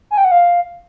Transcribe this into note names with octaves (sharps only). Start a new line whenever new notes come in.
G#5
G5
F#5
F5